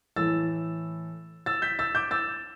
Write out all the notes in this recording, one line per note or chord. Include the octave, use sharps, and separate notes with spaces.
A2 E3 A3 E6 A6
E6 A6
G6 B6
E6 A6
D6 G6
E6 A6